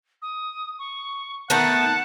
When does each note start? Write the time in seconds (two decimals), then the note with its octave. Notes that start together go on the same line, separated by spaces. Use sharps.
0.22 D#6
0.79 C#6
1.50 D#3 A3 B3 F#5 A5